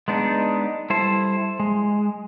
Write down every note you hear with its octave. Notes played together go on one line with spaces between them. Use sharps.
G#3 B3 D4 D#4
G3 E4 A4 C5
G#3